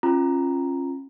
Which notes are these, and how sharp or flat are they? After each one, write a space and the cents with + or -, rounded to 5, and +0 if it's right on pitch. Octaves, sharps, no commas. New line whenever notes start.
C#4 -30 F4 -15 A#5 +0